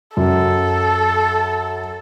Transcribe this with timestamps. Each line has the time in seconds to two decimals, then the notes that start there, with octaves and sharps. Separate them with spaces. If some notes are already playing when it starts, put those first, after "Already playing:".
0.17 F#2 A4